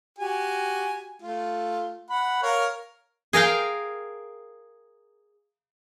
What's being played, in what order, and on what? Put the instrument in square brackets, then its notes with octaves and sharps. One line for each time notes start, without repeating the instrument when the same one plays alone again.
[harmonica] F#4 G4 G#5
A3 F4
F#5 B5
A#4 C#5 F5
[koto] G#4 A#4 F5 G5